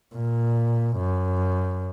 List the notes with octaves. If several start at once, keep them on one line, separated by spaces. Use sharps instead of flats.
A#2
F#2